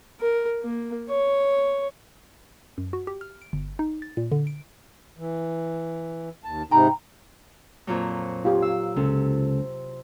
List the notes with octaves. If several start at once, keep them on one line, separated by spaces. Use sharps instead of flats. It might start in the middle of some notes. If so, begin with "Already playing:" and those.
A#4
A#3
C#5
F#2
F#4
G4
F6
D7
G1
D#4
A6
A#2
D3
D7
E3
D#2 A5
G#2 C3 D#4 G5 A#5 B5
F2 A#2 F#3
F4 G4
F5 E6
C#2 C3 C#4 A4